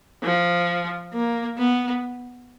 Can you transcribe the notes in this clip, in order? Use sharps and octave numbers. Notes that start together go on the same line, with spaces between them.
F3
A#3
B3